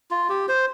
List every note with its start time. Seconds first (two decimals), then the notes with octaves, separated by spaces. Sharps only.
0.11 F4
0.29 G4
0.48 C5